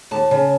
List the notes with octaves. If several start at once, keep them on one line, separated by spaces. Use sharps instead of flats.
D#2 A5
C#3